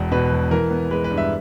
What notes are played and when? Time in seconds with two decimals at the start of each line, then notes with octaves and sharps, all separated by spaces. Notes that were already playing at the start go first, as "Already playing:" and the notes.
Already playing: E1 E2
0.11 B2 B4
0.31 E1
0.51 E3 A#4
0.71 B3
0.91 G#3 B4
1.04 B4
1.11 G2
1.17 E5